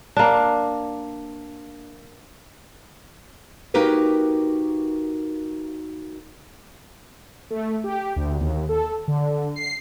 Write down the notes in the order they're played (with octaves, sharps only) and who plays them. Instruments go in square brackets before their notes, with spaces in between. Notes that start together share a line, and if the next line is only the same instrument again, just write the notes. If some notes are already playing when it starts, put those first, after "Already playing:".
[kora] A#3 D4
[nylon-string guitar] A#3 D#4 F#4 G4 A#4 B4
[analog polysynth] A3
G4
D2
D#2
A4
D3
C7